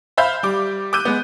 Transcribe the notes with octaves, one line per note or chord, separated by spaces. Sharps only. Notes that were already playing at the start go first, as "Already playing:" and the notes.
C5 E5 F5 B5 F6 G6
G3 D6
D6 E6 F#6 G6 D#7
G#3 B3